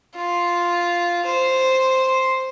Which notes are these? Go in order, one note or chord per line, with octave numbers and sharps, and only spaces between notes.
F4
C5